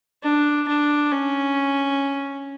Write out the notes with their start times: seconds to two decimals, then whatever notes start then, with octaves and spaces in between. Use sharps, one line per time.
0.23 D4
0.68 D4
1.12 C#4